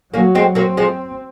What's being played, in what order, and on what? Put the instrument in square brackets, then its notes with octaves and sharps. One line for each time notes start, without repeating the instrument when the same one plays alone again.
[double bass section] F#3 [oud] A#3 C#4
[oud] G#3 C4
[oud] F#3 A#3 [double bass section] C4
[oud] F3 G#3